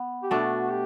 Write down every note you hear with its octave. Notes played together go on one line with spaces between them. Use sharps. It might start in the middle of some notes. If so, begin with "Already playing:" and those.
Already playing: B3
G4
B2 A3 D4 F#4
G4